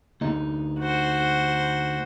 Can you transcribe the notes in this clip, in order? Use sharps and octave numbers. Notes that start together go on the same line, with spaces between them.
D2 D#4
F#4 C5